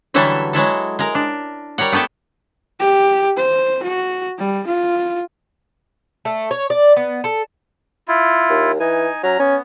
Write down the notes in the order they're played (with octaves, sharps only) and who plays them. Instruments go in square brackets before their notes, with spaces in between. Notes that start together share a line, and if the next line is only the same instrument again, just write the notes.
[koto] D3 E3 F#3 G3 A4 E5
F#3 G#3 E4 A4
G#3 A#4
D4
G3 A#4 C#5 F#5
A3 B3 E4 G4 A4
[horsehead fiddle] G4
C5
F#4
G3
F4
[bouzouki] A3
C#5
D5
B3
A4
[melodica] E4 F4
[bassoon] D#2
[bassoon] E3 [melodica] D#4 G#5
[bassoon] F#3 [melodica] C#4 A#5
[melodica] B3 [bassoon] C#4